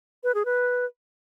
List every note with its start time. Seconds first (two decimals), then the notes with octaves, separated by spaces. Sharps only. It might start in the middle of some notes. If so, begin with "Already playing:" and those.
0.24 B4
0.34 G#4
0.45 B4